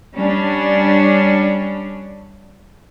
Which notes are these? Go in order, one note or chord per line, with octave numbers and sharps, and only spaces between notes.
G3 C#4 D4